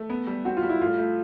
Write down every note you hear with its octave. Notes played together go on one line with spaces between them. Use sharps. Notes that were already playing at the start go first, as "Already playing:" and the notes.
Already playing: A3
B3
G3
C4 F#4
F4
G3
E4
A2 F4
A3